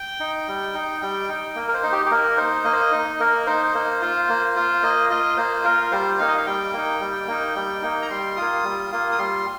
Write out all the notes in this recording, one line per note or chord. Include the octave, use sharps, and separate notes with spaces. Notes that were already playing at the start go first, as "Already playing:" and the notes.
Already playing: G5
D#4
G3
D#4
G3 G5
D#4
A#3
A#4
C5
D#4
G4
G4
A#3 A#4
D#4 C5
A#3 D#5
C5
D#5
D#4
A#3 A#4
D#4 C5
A#3
F4
A#3
F4
A#3 D#5
F4 D#5
A#3 C5
F4 A#4
G3 C5
A#3 D#4 F5
D#5
F5
G3 G5
A#3 D#4
G3
A#3 D#4
G3
A#3 D#4
A#5
G3 C6
A#3 F4 D#6
G3
A#3 F4
D#6
G3 C6